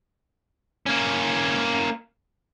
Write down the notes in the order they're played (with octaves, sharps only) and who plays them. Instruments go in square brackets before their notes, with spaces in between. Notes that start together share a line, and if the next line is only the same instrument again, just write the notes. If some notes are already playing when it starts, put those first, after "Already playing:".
[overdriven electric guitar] A#3 C#4